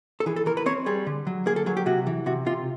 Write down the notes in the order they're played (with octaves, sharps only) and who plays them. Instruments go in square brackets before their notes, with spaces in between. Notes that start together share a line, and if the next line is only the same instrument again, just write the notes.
[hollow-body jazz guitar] A4
E3 G#4
A4
E3 A#4
B4
C4 C#5
G3 G#4
D3
F#3
A#3 G#4
A4
F#3 G#4
G4
C3 F#4
E3
C3 F#4
C3 F4